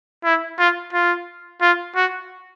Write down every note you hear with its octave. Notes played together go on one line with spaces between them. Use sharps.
E4
F4
F4
F4
F#4